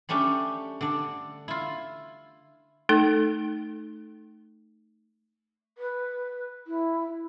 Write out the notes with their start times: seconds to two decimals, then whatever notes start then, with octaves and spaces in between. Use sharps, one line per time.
0.09 G3 A3 C#4 D4 G4
0.81 D3 D4
1.48 E4 F4
2.89 A3 D#4 A4
5.78 B4
6.67 E4